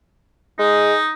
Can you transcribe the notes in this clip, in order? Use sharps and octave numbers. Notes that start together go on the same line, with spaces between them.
G#3 D#4